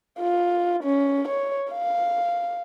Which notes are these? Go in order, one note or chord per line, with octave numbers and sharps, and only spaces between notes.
F4
C#4
C#5
F5